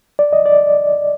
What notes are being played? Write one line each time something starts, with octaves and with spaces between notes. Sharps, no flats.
D5
D#5
D5